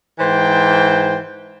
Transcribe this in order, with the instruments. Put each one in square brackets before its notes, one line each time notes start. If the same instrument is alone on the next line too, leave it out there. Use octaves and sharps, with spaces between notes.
[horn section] G#2 E3 C5 G5